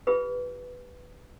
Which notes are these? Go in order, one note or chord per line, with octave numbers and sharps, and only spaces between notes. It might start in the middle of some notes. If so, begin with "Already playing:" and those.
F4 G4 B4